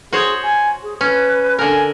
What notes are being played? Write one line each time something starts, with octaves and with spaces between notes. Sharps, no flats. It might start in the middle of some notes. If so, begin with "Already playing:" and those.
F#4 G#4 C5 C#5
G#5
G#4
C#4 B4
D3 A#4 G#5